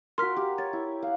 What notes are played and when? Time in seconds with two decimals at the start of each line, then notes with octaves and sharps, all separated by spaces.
0.18 F#4 A#4 C6 F6 B6
0.36 G4
0.58 C#5 A6
0.73 E4
1.03 F5 F#5